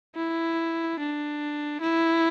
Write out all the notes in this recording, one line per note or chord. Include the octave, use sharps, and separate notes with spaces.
E4
D4
E4